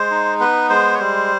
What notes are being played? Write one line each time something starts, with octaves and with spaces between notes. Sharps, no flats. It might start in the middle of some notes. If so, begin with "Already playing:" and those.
Already playing: G#3 C5
D#4
B3 B4
G#3 C5
C#5
G3 C5